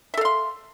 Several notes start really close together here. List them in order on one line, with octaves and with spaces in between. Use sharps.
E5 A4 F5 C6